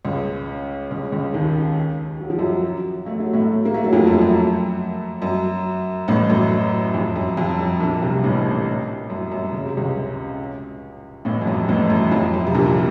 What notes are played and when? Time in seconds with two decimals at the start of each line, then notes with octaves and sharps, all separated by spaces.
0.05 C#2 C#3
0.91 C#2 C#3
1.12 C#2 C#3
1.34 D#2 D#3
2.20 F#3
2.30 F3
2.38 F#2 F#3
3.06 A3
3.20 F#3
3.33 A2 A3
3.65 A#3
3.74 A3
3.84 F#3
3.93 F2 F3
4.07 F#2
4.21 F#2
5.22 F#2
6.08 A1 A2
6.30 F#2
6.94 F2
7.16 F#2
7.37 F2
7.59 F#2
7.80 A#1 A#2
8.02 C2 C3
8.24 A1 A2
9.10 F#2
9.32 F#2
9.53 C#3
9.65 C3
9.77 C#2 C#3
11.25 A1 A2
11.42 F2
11.47 F#2
11.69 A1 A2
11.90 F#2
12.12 F2
12.33 F#2
12.47 C3
12.55 A#1 A#2